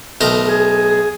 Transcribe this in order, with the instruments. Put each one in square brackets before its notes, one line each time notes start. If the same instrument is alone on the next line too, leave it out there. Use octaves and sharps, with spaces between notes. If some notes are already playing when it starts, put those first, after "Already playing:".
[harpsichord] B1 A3 A#4
[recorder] G#4